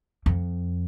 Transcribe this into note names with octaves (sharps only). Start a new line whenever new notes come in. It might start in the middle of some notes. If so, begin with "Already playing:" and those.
F2